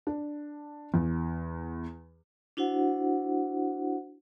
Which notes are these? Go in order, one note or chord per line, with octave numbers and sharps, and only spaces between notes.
D4
E2
D4 E4 F#4 C5 F#5